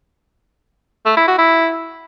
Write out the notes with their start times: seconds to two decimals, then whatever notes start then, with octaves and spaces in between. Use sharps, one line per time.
1.06 A3
1.17 E4
1.28 F#4
1.38 E4